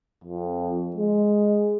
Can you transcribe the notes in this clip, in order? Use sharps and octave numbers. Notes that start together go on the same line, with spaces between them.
F2
G#3